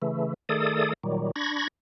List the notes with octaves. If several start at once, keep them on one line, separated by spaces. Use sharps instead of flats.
C#3 E3 A3
D#3 A3 G#4 A4 D5 D#6
A#2 D#3 F#3 G3
D4 B5 C#6 G#6 A#6